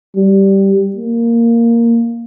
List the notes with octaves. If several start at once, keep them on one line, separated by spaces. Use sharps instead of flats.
G3
A#3